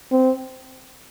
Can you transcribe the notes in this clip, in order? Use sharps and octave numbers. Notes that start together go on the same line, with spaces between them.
C4